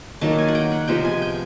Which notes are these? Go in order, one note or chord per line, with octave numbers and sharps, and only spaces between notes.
D#3 F#3 A#3 A5
G#5
F#5
G5
F#5
C3 F3 G#3 B3 G5
G#5
G5